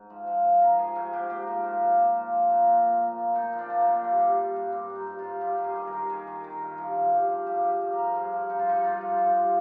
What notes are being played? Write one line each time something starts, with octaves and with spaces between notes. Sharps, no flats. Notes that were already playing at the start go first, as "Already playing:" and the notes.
Already playing: G#2
F3
F3
F3
F3 A#4
F3 G#4
G#2 G#4
G#2 G4
A#2 G4
F3
A#2
F3
A#2
F3
F3
A#2
A#2 C4
A#2
A#2
A#2
A#2 D#4
F3
D4
A#2
A#3
F3
G2
G2
G2
G2
G2 C4
G2
D#4
G2
F4
G2
G2 G4
D#3
G#4
G2
A#4
D#3
D#3 G#4
D#3
D#3
G2
F3
G2
G2
F3
G2 G4
G2
G#4
F3
A#4
F3
G2 G#4
F3
G2 D#4
F4
G2 D#4
G2 F4
F3
G2
F3